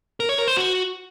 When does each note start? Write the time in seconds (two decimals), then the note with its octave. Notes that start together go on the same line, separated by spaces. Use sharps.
0.20 A#4
0.29 C#5
0.38 A#4
0.47 C5
0.57 F#4